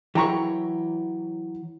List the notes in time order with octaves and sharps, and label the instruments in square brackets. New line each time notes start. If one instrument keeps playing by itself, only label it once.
[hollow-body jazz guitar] E3 F#3 [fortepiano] G5 A#5 C#6